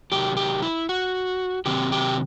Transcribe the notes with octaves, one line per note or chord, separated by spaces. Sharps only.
C3 D#3 F#3 G4
G4
E4
F#4
C3 D#3 F#3 C4 G4
G4